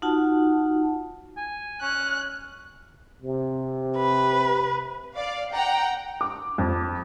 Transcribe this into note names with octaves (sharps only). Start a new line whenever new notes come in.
D#4 F4 F#4 F#5 A5
G#5
C#4 F#6
C3
B4
D5 F5
F#5 G5 A#5
D6
F2